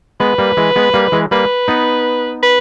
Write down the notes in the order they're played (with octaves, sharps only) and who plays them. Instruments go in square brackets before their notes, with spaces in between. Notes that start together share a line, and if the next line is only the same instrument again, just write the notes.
[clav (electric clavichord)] G#3 B3 [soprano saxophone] B4
[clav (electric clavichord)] G3 A#3
E3 G#3
G#3 B3
G3 A#3
E3 G#3
[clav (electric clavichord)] G3 A#3 [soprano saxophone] B4
[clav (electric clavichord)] B3 D#4
[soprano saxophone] B4